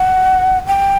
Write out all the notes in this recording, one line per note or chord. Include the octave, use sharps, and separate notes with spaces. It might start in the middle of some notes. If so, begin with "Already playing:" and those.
Already playing: F#5
G5